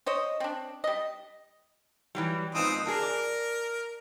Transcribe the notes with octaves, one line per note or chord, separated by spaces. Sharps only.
C5 C#5 D#5
C4 D4
G3 D#5
E3 F#3 G3
G#2 F3 B3 C4 D#4 D#6
D4 F#4 G#4 A#4
D5